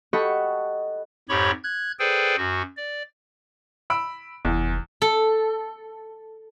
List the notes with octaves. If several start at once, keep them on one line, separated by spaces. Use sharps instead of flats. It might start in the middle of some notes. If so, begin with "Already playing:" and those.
G4 A4 D#5 F#5 B5 C#6
F2 G#2 G4 C#5 B5 C#6
F#6 G#6
G#4 A4 B4 C5 D5 G5
F#2 F#4
D5
B5 E6 D7
F1 E2
A4